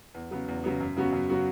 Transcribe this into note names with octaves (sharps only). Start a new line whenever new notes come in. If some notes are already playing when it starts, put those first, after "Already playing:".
E2
C#3 F#3 B3
E2
C#3 F#3 B3
F#2
C#3 F#3 B3 F#4
F#2
C#3 F#3 B3 F#4